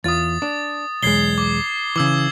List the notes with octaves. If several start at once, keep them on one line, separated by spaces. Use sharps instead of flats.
E2 F4 D#6 A6
D4
B1 E2 G#3 G#6 C7 G7
D6
C#3 E3 D6 E6 G#6